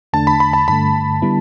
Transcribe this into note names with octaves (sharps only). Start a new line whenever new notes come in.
E2 D3 A3 D4 A5
B5
B5
A5
G2 D3 A3 B5
D3 G3 B3 E4